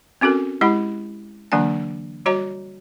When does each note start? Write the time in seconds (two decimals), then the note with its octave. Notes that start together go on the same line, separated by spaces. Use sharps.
0.21 C4 C#4 F#4 A4 A#4
0.61 G#3 E4 G4 F#5 B5
1.52 D3 E3 F#3 A#3 D4 G#5
2.26 G3 F#4 C#5 D#5 A#5